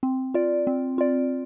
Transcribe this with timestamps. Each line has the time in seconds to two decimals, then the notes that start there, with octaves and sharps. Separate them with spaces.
0.03 C4
0.34 F4 D5
0.67 C4
0.98 F4 D5